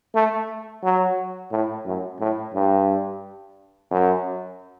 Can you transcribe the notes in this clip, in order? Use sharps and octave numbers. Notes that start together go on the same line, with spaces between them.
A3
F#3
A2
F#2
A2
G2
F#2